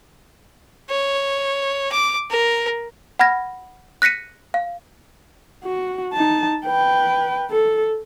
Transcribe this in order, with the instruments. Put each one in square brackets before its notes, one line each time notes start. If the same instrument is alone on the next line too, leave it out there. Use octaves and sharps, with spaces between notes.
[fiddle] C#5
D6
A#4
[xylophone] F#5 B5 F6 G#6 A#6
F#6 A#6 B6 C#7 D#7
F5
[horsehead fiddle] F#4
D#4 A5
B4 G5
A4